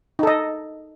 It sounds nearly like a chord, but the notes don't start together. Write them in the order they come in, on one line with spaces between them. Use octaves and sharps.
D#4 A4 D#5